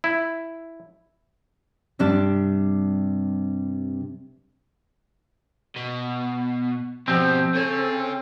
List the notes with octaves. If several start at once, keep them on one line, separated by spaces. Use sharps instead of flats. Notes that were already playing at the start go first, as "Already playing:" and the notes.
E4
G2 C3 G3 D4 A5
B2
B2 F3 G3 C4
G#4 A4 C#5